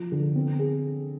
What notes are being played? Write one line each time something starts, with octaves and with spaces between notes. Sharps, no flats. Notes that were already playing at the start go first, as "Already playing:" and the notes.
Already playing: F3 F4
D3
C4
G#4